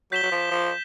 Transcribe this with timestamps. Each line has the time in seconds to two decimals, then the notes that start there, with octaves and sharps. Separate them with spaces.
0.12 F#3 G6 B6 E7 G7
0.23 F#3
0.31 F3
0.51 F3